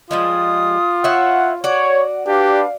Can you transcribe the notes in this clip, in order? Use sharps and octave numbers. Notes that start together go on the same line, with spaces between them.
F3 G3 G#3 F4 D#6
E4 C#5 E5 F#5
F#4 C#5 D5 F#5
D4 G4 B4 F5